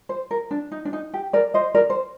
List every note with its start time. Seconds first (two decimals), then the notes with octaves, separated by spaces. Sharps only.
0.09 C5
0.31 A#4
0.51 D4
0.71 D#4
0.85 D4
0.93 D#4
1.14 G4
1.33 A#4 D5
1.54 C5 D#5
1.75 A#4 D5
1.90 C5